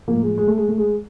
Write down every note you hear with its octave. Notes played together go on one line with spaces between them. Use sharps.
A2 F3 A#3
G#3
G#3
A3
G#3
A3
G#3